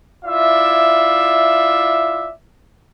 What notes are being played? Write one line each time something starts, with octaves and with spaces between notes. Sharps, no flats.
E4 F4 D5 E5